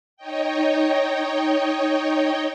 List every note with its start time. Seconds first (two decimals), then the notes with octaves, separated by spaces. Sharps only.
0.17 D#4 C#5 D#5 G5